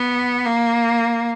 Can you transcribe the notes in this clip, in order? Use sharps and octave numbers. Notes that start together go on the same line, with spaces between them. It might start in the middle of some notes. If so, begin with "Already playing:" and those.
Already playing: B3
A#3